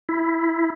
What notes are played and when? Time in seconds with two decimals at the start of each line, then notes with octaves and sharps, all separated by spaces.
0.09 E4